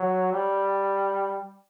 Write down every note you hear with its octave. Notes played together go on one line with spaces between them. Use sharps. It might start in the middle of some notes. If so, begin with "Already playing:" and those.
Already playing: F#3
G3